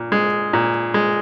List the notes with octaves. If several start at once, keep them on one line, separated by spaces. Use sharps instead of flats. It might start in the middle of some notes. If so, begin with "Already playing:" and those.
Already playing: A#2
G#3
A#2
G#3